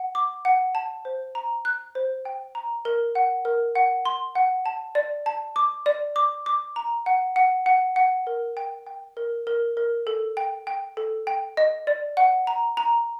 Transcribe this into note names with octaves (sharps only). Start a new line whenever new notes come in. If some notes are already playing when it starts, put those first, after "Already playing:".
Already playing: F#5
D6
F#5
A5
C5
A#5
F#6
C5
G5
A#5
A#4
F#5
A#4
F#5
C6
F#5
A5
D5
A5
D6
D5
D6
D6
A#5
F#5
F#5
F#5
F#5
A#4
G5
G5
A#4
A#4
A#4
A4
G5
G5
A4
G5
D#5
D5
F#5
A#5
A#5